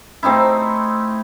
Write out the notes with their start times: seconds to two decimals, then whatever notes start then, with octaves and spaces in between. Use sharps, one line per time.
0.23 A3 C4 D#4 E4